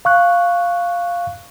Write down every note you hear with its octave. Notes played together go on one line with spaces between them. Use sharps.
F5 C#6 F#6